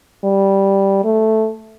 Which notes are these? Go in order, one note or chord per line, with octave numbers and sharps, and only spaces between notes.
G3
A3